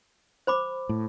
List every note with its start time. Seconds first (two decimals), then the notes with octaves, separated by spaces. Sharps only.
0.47 C5 B5 D6
0.89 A2